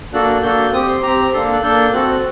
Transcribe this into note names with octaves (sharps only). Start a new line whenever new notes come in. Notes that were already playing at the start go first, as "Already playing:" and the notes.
A#3 D4 F#4 A4 F#6
A#3 D4 F#4 A4 G6
C4 G4 D#6
C6
C4 G4 A#5
A#3 D4 A4 C6
F#6
A#3 D4 A4 G6
C4 F#4 A4 F#6